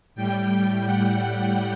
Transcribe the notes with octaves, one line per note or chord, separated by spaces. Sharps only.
A2 G3 G5
F#5